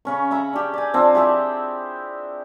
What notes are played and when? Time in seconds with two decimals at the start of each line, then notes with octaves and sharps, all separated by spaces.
0.05 C#3 C#4 C#6
0.31 E5 A#5 B5
0.53 D4 G4
0.74 D5 G#5
0.94 F3 C4 D4
1.15 E4 G4 G#4 E5